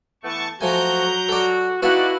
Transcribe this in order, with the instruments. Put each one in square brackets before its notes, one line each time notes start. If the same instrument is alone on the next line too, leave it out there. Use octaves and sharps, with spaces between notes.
[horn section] E3 A3 B3 [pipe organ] A5 C#6
[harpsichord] F3 A3 G#5 [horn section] F#3 [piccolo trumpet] F#4 [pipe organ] A#5 G6
[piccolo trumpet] F#4 [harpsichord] A4 D5
[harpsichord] B3 F5 A5 [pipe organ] D#4 D5 [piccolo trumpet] E4 [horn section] F#4